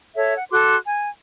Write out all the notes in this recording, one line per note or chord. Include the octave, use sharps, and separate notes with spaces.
A4 C#5 E5
F#5
F#4 A4 C6 D6
G#5